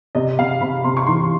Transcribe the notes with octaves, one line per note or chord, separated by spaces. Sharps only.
C3 D#5
C3 F5
C3 B5
C3 C6
C#6
E3 C6